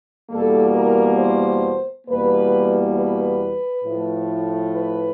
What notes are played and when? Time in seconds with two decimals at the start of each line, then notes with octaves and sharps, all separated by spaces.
0.30 E2 B2 G3 A#3 A4
0.74 A#4
1.19 C5
2.07 E2 B2 G3 A#3 B4
2.96 B4
3.84 A2 F3 A3
4.73 B4